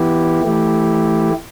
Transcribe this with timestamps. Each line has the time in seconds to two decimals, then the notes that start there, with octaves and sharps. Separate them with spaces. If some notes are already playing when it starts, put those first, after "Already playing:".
Already playing: E3 B3 E4 G4
0.44 E3 A3 E4 G4